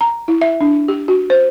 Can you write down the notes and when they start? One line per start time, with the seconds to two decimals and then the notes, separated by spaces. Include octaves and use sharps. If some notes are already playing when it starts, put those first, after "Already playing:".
0.01 A#5
0.28 E4
0.41 E5
0.61 D4
0.88 G4
1.08 F#4
1.30 C5